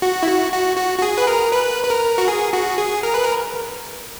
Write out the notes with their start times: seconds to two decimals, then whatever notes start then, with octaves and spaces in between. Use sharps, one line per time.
0.02 F#4
0.23 E4
0.27 F#4
0.52 F#4
0.77 F#4
0.98 F#4
1.02 G#4
1.18 B4
1.27 A#4
1.52 B4
1.84 B4
1.90 A#4
2.18 F#4
2.28 G#4
2.53 F#4
2.78 G#4
3.03 A#4
3.14 B4
3.24 A#4